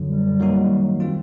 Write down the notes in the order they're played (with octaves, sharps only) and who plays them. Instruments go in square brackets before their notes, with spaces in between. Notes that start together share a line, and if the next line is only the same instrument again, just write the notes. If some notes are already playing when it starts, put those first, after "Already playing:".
Already playing: [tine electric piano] F#2 D3 F#3
[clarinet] G3
[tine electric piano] D#3 F#3 A#3 D#4 F#4
G3 C4 F4